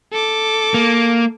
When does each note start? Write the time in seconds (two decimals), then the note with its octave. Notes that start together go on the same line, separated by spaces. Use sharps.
0.13 A4 D6
0.74 A#3